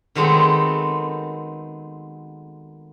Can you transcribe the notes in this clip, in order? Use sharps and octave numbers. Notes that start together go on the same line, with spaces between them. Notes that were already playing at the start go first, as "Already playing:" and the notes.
D#3 F#3 G#3 A3 B3 C4